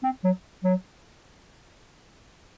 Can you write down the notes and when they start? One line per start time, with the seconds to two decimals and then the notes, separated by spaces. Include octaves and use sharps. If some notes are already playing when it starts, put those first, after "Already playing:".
0.03 C4
0.24 F#3
0.64 F#3